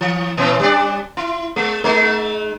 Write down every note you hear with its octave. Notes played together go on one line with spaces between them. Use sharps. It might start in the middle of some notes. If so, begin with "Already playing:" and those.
E3
A#2 E3 C#4
G3 D4 D5
E4
G#3
G#3 D#4